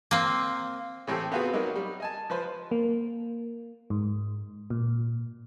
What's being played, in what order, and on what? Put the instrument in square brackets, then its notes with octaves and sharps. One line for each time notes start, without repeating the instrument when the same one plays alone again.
[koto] A#3 C4
[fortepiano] A2 E3 C4 G4 A4
B3 C4 F4 F#4 G#4 B4
F#3 G3 A#3 D#4 A#4
G3
D#5 G#5 A5
F3 B4 C5
[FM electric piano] A#3
G#2
A#2